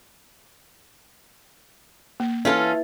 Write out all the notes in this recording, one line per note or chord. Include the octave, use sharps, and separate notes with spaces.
A#3
E3 C#4 F4 A4